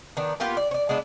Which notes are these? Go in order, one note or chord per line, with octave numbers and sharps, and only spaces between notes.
D#3 B3 D4
A#3 B3 F4 G4
D5
C#5 D5
G#3 B3 D4 E4